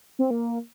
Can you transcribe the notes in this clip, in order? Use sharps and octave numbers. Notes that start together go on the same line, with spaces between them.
C4
A#3